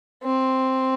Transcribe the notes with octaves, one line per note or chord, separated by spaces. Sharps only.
C4